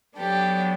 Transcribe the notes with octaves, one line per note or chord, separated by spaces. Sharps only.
F#3 B3 D4 G4 A4